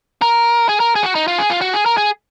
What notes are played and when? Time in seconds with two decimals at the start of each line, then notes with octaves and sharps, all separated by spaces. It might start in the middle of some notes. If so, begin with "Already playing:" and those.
0.22 A#4
0.69 G#4
0.80 A#4
0.95 G#4
1.03 F#4
1.15 D#4
1.28 F4
1.38 G#4
1.50 F4
1.61 F#4
1.74 G#4
1.86 A#4
1.97 G#4